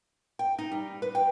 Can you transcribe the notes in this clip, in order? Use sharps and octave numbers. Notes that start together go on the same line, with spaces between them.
G5
D#4
G3
B4
G5